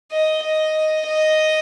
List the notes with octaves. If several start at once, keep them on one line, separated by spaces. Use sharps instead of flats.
D#5
D#5
D#5